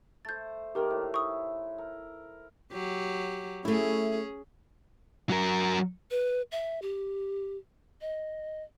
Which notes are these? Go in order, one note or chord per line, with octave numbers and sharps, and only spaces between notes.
A3 C5 G6 A6
D#3 A#3 G4 A#4
A2
E4 C#6 D#6
A#4
F#3 G4
A3 C#4 E4 G#4
F#3 A#4
B4
E5
G4
D#5